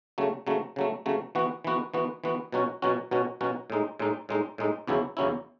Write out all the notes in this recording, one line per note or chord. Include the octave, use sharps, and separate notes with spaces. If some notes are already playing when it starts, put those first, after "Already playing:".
C#3 F#3 A3
C#3 F#3 A3
C#3 F#3 A3
C#3 F#3 A3
E3 B3 F#4
E3 B3 F#4
E3 B3 F#4
E3 B3 F#4
B2 F#3 C#4 F#4
B2 F#3 C#4 F#4
B2 F#3 C#4 F#4
B2 F#3 C#4 F#4
A2 G#3 D#4
A2 G#3 D#4
A2 G#3 D#4
A2 G#3 D#4
E2 C#3 F#3 C#4 E4
E2 C#3 F#3 C#4 E4